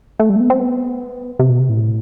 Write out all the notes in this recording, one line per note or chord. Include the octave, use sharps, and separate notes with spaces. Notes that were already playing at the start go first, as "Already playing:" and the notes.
A3
G3
A3
B3
C4
B3
C3
B2
C3
A2